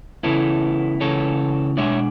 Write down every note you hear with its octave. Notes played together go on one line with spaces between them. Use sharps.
C#2 C#3 E3 B3 E4 A4 C#5
C#2 C#3 E3 A4 C#5
B2 G#3 D4 C#5 E5